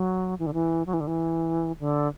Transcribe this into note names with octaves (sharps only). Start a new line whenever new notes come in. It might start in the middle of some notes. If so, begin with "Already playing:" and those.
Already playing: F#3
E3
D3
E3
F#3
E3
D3
E3
D3